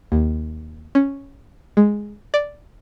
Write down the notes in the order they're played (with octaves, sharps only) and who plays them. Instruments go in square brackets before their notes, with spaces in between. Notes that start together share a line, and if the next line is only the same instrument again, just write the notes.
[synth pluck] D#2
C#4
G#3
D5